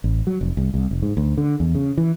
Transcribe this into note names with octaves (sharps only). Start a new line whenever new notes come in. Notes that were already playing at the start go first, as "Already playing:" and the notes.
A1
F#3
F1
C2
C2
F1
G#2
D2
D3
E2
C#3
E3